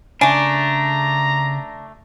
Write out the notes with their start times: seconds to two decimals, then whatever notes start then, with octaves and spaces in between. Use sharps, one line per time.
0.21 C#3 A3 D4 G#5 A#5